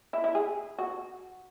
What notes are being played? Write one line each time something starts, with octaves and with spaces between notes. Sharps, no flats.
E4
E4
G#4
F#4